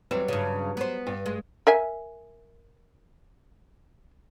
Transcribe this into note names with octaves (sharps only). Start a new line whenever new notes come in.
E2 F#3 G3 C4 B4
G2 C#3
B3 C5
G2
G#3
A#4 E5 G#5